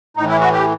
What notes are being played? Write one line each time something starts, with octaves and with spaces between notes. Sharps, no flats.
A2 D#4
E3
E4
F#4
G4